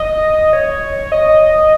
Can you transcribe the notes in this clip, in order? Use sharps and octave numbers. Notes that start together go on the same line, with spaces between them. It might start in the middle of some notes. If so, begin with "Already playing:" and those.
Already playing: D#5
C#5
D#5